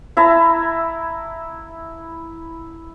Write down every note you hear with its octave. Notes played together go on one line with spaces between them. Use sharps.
E4 E5 A5 A#5